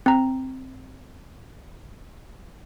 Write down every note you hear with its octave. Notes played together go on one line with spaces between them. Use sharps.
C4 A#5